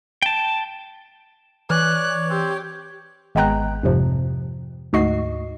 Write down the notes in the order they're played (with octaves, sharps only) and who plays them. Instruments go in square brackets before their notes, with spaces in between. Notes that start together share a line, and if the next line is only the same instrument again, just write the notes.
[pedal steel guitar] G5 A5
[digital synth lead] E3 [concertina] C#5 [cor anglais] D5 [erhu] F#6
[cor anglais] C4 [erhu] G4
[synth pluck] G#1 G#3 B3 G5 A#5 F#6
F2 G#2 C3 F3
D2 G#2 F#4 D#5 C7